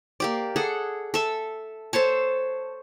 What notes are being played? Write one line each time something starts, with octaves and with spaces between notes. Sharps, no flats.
A#3 G4 D5
G#4 A4 F#5
A4 E5
A4 C5 C#5 A5